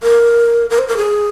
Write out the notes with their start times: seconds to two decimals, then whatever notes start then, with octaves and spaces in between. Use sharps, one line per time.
0.03 A#4
0.70 A#4
0.79 C5
0.88 A#4
0.97 G#4